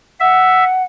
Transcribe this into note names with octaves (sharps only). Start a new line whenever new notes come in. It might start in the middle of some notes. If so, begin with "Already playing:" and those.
E5 F#5